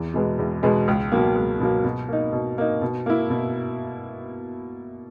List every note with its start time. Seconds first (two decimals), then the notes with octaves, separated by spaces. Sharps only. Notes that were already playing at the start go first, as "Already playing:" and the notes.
Already playing: E2
0.14 B2 G#3 B3
0.39 E2
0.63 B2 G#3 B3
0.88 C#2
1.12 B2 F#3 A#3
1.36 C#2
1.60 B2 F#3 A#3
1.84 B2
2.08 A#3 D#4
2.32 B2
2.58 A#3 D#4
2.82 B2
3.06 A#3 E4
3.30 B2